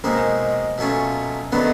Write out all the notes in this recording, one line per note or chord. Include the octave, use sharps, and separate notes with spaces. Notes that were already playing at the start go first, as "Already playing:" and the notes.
B2 G#3 A#3 C4 D#4
B2 F#3 A3 C#4 F4
D#3 F#3 A3 B3 D4